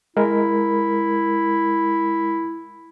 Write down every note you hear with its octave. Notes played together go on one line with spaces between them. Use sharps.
G#3 E4 A#4